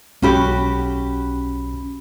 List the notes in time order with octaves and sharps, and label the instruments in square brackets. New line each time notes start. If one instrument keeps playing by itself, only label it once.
[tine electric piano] B1 B5 [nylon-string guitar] C#4 F#4 G4